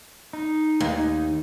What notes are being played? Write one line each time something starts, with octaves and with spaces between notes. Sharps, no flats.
D#4
D#2